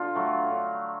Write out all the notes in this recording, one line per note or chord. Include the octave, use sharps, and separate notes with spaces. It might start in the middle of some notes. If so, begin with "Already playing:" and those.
Already playing: D3 F4
F#3 A3
D3